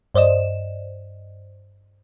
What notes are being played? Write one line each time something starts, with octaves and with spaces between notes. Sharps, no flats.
G2 C5 D5 D#5 E7